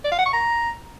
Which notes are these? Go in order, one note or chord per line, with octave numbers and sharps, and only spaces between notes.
D5
F5
F#5
C#6
A#5